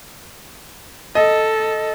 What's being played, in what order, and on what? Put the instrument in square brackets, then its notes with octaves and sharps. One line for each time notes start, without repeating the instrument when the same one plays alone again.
[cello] A4 [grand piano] D#5